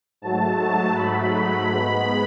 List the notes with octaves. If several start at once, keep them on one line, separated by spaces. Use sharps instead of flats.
G#2 F#3 A3 A5
A5
B5
G#2 G#3 B3